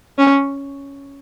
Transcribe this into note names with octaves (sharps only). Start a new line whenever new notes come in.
C#4